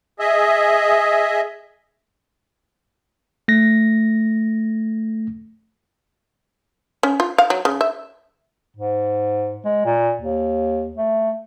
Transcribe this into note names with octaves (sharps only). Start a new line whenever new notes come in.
G#4 D#5 E5
A3 A#6
C#4
F4
F5
F#3
C#3
E5
G#2
G#3
A#2
D#2
A3